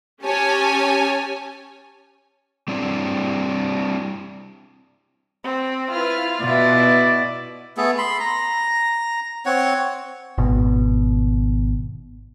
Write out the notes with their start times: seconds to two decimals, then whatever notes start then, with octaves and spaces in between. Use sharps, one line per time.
0.24 C#4 G4 C#5 G#5 A5
2.68 G3 C4 D4 E4
5.44 C4
5.91 E4 F4 B4 F6
6.41 B2 E4 B4 D5
7.77 A3 B3 G#4 A4
7.98 B5 C6
8.20 A#5
9.46 C4 C#5 F#5
10.38 G#1 B2